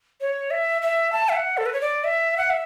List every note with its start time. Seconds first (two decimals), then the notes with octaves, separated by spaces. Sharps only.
0.21 C#5
0.51 E5
0.82 E5
1.12 A5
1.29 E5
1.36 F#5
1.57 A4
1.66 B4
1.73 C#5
1.81 D5
2.04 E5
2.38 F#5
2.50 E5